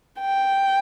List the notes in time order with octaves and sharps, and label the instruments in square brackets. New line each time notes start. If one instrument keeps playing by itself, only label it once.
[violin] G5